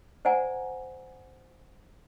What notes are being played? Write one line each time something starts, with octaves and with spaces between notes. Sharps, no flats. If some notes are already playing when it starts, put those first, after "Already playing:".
C5 D5 F#5 G#5 A#5